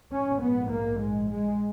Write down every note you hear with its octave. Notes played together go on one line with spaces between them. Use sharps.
A#1 G#2 C#4
B3
A#3
G#3
G#3